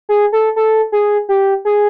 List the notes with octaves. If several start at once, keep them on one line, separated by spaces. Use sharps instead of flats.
G#4
A4
A4
G#4
G4
G#4